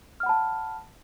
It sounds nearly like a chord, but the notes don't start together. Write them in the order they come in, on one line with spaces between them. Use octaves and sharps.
F6 F#5 B5 A5